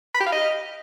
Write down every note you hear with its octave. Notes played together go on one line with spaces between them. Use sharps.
B5
G4
F5
D#5